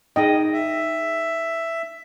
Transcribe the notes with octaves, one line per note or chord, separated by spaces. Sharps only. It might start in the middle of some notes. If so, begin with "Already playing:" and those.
D#4 G#4 D#5 G5
E5